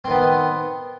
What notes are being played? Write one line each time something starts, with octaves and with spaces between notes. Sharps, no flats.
D#3 B3 C4